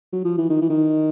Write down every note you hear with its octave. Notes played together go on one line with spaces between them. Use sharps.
F#3
F3
E3
D#3
E3
D#3